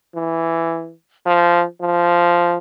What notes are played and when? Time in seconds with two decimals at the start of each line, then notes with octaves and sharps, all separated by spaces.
0.15 E3
1.26 F3
1.80 F3